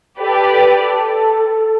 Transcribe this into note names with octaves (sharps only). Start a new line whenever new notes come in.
G4 A4 B4 D5
A4